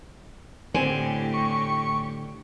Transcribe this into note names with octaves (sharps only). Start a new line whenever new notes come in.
A2 D3 C4 G4 G#5
C#6